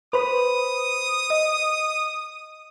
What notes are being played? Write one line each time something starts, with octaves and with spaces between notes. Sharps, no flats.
B4 C5 B5 D#6
D#5